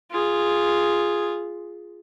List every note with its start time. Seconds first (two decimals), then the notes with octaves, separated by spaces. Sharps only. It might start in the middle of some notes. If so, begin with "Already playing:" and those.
0.11 F4 G#4